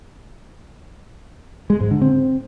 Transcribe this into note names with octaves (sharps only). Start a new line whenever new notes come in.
G#3
G#2
D3
C4